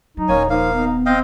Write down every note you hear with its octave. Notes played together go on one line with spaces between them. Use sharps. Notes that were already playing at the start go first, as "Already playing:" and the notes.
F#3 D#4
D#1 A#3 C#4 C#5 G#5
F3 A#3 D#4 F5
B3 D#4
C4 D#5 F5 G5